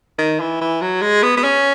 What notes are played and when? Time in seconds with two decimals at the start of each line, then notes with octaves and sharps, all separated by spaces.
0.19 D#3
0.40 E3
0.61 E3
0.81 F#3
1.02 G#3
1.23 B3
1.37 B3
1.44 C#4